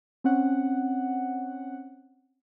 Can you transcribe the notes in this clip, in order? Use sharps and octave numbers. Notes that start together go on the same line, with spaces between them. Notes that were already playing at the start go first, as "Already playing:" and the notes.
C4 C#4 F#5